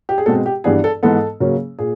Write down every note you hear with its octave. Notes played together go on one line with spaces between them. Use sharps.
G4
G#4
B2 G#3 C4 A4
G4
G2 E3 G3 B3 D4 G#4
A4
G#2 E3 G#3 B3 A4
C#3 F#3 A#3 C#4
A#2 G#4